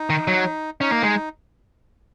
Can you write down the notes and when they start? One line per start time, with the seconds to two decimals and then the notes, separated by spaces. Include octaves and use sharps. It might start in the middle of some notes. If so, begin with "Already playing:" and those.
Already playing: D#4
0.10 D#3
0.27 F#3
0.81 C#4 D#4
0.92 A#3
1.03 G#3